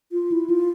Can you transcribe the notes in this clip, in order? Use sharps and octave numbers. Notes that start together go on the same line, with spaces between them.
F4
E4
F4